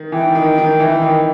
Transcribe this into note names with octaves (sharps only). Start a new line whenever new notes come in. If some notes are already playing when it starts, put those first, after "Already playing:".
Already playing: D#3
E3 G5
D#3
D#3
E3
D#3